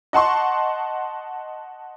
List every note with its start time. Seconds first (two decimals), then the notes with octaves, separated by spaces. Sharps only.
0.13 D#5 F#5 A5 C6 C#6